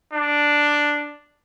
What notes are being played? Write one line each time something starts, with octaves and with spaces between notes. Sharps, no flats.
D4